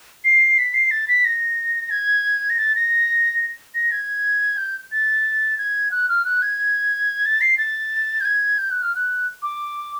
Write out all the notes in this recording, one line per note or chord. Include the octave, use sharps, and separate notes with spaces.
C7
B6
C7
A6
B6
A#6
G#6
A#6
A6
A#6
A#6
G#6
G6
A6
G#6
F#6
F6
F#6
G#6
A6
C7
A6
G6
G#6
G6
F#6
F6
F#6
D6